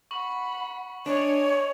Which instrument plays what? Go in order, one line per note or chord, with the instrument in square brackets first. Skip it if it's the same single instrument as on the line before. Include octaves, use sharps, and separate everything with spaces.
[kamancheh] F#5 B5 [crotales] C#6 F#7
[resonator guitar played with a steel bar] D4 [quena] C#5 [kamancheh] D#5 G#5